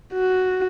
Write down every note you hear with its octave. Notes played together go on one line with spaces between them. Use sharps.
F#4